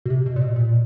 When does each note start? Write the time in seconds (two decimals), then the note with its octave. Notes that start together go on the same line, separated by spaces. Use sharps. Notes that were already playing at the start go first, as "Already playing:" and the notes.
0.06 B2
0.10 C3
0.26 B2
0.36 A#2
0.41 B2
0.56 A#2